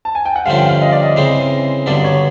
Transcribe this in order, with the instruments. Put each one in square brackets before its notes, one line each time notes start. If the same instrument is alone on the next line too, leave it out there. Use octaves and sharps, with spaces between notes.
[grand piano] A5
G#5
G5
F#5
[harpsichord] G2 D3 F3 A3 C#4 [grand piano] F5
[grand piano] G5
F5
D#5
D5
D#5
[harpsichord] C#3 E3 G#3 C4
[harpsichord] G2 D3 F#3 B3 [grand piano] D5
[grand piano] C#5